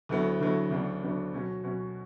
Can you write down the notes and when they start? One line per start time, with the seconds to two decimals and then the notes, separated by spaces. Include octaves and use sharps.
0.09 D2 D3 F#3 B3 E4
0.40 D2 D3 F#3 B3 E4
0.71 D2 C#3 F#3 B3 D4
1.02 D2 C#3 F#3 B3 D4
1.33 B2 F#3 C#4 F#4
1.63 B2 F#3 C#4 F#4